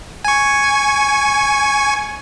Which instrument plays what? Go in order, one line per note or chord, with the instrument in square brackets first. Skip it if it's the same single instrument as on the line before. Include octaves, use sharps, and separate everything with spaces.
[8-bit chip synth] G#5 C#6